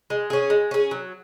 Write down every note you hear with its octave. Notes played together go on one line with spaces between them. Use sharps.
G#3
C#4 G#4
G#3
C#4 G#4
F#3